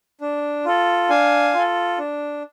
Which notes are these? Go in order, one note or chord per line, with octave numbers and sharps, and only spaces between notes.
D4
F4 A4
D4 F5 G#5
F4 A4
D4